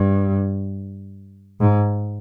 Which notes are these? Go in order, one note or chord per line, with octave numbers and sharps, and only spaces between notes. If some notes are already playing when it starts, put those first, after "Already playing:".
Already playing: G2
G#2